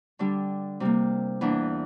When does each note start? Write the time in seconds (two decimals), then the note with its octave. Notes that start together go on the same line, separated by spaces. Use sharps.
0.19 D3 G3 D4
0.80 C3 G3 A#3
1.41 E2 E3 A#3 D4